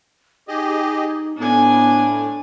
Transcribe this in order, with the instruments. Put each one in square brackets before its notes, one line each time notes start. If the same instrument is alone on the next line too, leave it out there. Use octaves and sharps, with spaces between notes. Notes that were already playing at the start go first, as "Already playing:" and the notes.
[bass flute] D#4 [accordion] G4 G#4 D#5
[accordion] A2 [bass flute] B3 [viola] D4 G#5